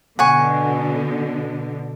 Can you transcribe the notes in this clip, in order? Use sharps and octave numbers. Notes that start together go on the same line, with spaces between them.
B2 D3 F#5 G#5 C#6